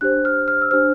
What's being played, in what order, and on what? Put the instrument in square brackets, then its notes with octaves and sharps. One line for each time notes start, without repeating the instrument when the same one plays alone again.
[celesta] D4 G4 C5 F#6
F6
F6
E6
D4 G4 C5 F6